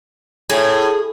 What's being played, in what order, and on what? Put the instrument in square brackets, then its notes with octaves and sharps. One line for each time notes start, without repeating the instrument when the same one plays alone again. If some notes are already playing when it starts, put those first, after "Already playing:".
[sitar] A2 [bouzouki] G#4